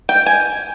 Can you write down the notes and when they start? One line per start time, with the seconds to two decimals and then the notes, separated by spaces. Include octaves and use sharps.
0.09 G5
0.26 G#5